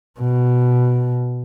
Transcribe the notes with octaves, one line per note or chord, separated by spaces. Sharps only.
B2